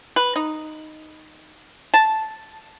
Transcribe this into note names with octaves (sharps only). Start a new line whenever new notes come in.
B4
D#4
A5